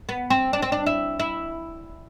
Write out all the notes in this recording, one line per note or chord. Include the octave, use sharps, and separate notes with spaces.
B3
C4
D4
C4
D4
E4
E4